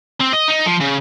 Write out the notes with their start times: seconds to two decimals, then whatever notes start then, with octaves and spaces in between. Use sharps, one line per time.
0.20 C4
0.32 D#5
0.48 D#4
0.66 F3
0.80 C#3